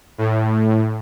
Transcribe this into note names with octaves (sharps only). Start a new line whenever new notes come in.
A2